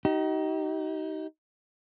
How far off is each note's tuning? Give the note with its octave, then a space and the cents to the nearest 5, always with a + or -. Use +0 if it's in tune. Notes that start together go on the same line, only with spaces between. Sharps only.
D#4 +20 G4 -40